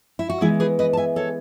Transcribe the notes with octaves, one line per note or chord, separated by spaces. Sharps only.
E4
F#4
E3 G#3 B3 E4 G#4
G#4 B4
B4 D#5
A5
E5 G#5
A4 C#5